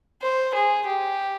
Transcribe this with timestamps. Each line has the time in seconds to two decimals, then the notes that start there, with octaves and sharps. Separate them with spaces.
0.22 C5
0.54 G#4
0.86 G4